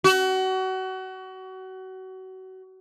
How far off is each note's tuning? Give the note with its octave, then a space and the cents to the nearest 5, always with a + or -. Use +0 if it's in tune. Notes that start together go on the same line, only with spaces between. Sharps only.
F#4 +30